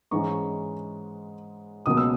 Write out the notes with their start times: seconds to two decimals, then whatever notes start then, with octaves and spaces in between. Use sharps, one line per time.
0.11 G#2 E3 G#3 C#4 A#5 C#6
1.86 C#2 B2 F#3 A#3 D#6
1.97 E6